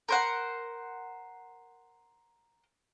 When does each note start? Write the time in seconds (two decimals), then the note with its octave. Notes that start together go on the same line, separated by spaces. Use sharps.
0.09 A#4 C5 F#5